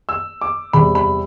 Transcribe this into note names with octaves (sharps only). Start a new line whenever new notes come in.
E6
D6
E2 C3 G3 B5
B5